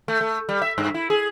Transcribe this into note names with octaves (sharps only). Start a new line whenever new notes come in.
A3
A3
G3
E5
G2
E4
G#4